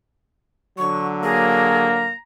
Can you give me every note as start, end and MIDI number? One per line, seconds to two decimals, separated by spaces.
0.78 2.11 50
0.78 2.11 54
0.78 1.06 85
1.24 2.14 58
1.24 1.88 68
1.24 2.14 82